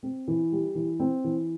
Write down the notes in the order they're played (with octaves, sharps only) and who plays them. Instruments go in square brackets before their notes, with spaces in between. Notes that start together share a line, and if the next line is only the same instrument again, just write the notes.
[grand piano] C4
E3
G3
E3
C4
E3